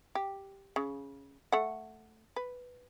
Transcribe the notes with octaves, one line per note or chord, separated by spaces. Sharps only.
G4
C#3
A3 F#5
B4